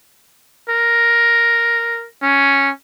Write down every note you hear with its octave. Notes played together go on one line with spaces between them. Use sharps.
A#4
C#4